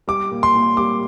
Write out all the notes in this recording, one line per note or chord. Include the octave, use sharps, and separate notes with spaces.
G3 D6
A#2
C6
A#2
G3 D6